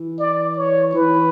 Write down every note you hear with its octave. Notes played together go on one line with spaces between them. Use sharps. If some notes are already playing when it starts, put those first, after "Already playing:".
Already playing: E3
D5
C#5
E3 B4